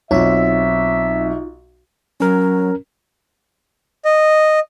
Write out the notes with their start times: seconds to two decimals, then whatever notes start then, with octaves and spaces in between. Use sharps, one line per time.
0.11 B1 C4 D#4 F4 C#5 E5
2.20 F#3 C#4 A#4
4.05 D#5